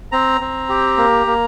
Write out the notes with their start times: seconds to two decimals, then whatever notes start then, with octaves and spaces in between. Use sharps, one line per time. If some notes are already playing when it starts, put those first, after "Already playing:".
0.12 C4 A#5
0.41 C4
0.69 G4
0.98 A#3
1.27 A#3